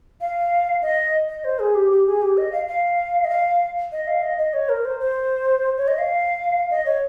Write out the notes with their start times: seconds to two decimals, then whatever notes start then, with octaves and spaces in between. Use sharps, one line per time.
0.21 F5
0.82 D#5
1.29 D#5
1.44 C5
1.59 G#4
1.75 G4
1.91 G4
2.06 G#4
2.22 G4
2.37 D#5
2.52 F5
2.68 F5
3.24 D#5
3.30 F5
3.92 D#5
4.07 F5
4.23 D#5
4.38 D#5
4.53 C#5
4.69 A#4
4.85 C5
5.00 C5
5.77 C#5
5.88 D#5
5.98 F5
6.70 D#5
6.86 C#5